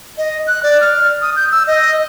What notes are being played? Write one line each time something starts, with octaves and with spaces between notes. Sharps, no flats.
D#5
F#6
D5
F6
D#6
G6
E6
D#5